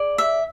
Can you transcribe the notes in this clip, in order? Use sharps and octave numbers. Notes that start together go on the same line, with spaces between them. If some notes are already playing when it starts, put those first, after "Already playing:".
Already playing: G#4 D5
E5